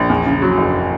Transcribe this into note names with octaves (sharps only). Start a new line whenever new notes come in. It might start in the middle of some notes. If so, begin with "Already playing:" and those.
Already playing: A#1
E2
C#3
F#3
F#1